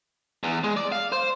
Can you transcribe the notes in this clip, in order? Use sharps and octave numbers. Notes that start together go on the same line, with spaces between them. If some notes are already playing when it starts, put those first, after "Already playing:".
E2
G#3
D5
F5
C5